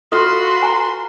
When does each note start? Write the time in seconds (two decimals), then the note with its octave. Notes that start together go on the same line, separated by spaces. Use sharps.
0.12 F4 F#4 A4 B4 F5 C6
0.62 G#5 A#5